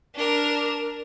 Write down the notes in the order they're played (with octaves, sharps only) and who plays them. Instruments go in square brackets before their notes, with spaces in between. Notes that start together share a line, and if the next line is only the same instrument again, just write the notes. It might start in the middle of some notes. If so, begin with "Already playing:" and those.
[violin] D4 A#4